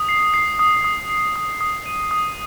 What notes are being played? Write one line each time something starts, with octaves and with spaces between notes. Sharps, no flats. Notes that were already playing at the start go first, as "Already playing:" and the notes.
Already playing: D#6
C7
C7
D#6
D#6
C7
D#6
D#6
D#7
D#6